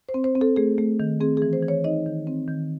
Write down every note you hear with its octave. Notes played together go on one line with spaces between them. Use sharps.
C5
C4
C5
C4
A4
A3 G#4
A3
D#3
C4 G#4
E3 G#4
C5
E3
C#5
D#4 D#5
D#3
C4
D#3